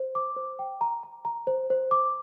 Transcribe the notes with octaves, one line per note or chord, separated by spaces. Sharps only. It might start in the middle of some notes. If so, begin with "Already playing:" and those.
Already playing: C5
D6
C5
G5
A#5
A#5
A#5
C5
C5
D6